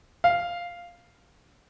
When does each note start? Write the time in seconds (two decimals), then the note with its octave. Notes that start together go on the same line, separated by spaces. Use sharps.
0.24 F5